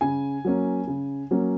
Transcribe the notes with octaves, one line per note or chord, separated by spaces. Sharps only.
C#3 G#5
F#3 A#3 C#4
C#3
F#3 A#3 C#4